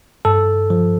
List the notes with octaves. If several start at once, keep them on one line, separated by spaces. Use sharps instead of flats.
G2 A4
F3